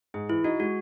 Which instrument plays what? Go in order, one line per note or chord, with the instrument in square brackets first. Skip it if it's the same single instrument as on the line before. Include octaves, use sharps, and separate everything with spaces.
[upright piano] G#2 [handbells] G#4
[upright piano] E3 [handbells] E4
[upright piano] D#4 [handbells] F#4
[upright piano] G#3 [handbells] F#4